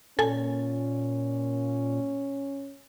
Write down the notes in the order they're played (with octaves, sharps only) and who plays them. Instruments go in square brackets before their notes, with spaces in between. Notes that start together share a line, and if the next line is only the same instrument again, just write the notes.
[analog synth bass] A#2 [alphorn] C#4 [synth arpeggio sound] A4 G#5